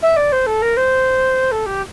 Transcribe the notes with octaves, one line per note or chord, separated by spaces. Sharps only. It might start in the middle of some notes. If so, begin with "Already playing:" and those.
E5
D5
C5
A4
A#4
C5
A4
G4